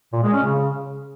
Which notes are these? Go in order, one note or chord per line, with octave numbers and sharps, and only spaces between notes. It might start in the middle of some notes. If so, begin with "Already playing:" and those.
A#2
G#3
C#4
C#3